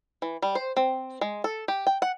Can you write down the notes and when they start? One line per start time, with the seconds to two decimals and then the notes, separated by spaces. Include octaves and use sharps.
0.22 E3
0.42 G3
0.55 C5
0.77 C4
1.21 G#3
1.44 A4
1.68 G4
1.87 G5
2.02 F#5